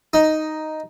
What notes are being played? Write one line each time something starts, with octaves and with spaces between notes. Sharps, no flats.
D#4